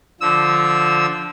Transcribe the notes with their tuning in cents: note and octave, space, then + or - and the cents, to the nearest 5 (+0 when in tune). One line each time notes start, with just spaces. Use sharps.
D3 +0 F3 +0 E6 -20